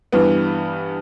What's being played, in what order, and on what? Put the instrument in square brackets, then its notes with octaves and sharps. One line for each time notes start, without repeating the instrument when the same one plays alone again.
[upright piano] G2 E3 G3 B3